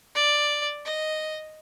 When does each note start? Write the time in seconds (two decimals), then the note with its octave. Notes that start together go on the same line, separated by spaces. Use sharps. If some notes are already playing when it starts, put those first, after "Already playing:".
0.15 D5
0.85 D#5